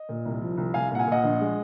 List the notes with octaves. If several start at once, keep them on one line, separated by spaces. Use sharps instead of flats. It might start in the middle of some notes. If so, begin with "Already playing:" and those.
Already playing: D#5
A#2
C2
F3
C2
C2 F5 G#5
A#2 F#5
F5 G#5
A#2 D#5 F#5
A#1
G#3